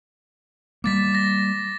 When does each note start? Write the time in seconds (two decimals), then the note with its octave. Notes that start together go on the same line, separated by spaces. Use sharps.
0.84 G3 A#3 D6 A6 B6
1.13 D6 A#6